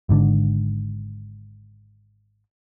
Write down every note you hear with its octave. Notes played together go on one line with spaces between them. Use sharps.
G#1 G#2 D3